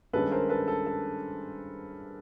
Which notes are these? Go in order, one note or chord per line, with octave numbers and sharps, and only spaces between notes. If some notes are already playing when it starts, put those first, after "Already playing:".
G2 D#3 G#3 C#4 A4 B4
A#4 C5
A4 B4
A4
A4